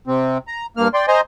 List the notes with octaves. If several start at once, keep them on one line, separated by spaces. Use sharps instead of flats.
C3 C4
A#5
G2 A#3 F6
D5 G5 C6
C5 D#5 G#5 A#5 C6